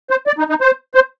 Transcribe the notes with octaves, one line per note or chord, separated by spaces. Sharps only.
C5
D5
D#4
D#4
C5
C5